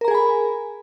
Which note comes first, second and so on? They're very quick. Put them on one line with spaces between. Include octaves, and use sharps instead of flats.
A#4 A#5 G#4 G#5 B5